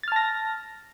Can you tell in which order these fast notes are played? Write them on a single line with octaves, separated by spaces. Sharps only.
A6 F6 A5 A#6